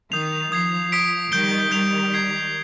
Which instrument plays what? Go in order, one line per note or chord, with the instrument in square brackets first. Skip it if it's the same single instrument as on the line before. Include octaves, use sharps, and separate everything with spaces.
[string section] D#3 [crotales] D#6 G6 C7 F7
[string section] F3 [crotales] D#6 G#6 C7
[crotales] D#6 B6 D7
[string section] D#3 G3 [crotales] G6 D7 G7
[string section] D#3 G3 [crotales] G6 D7 F7
[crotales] G#6 C7 G7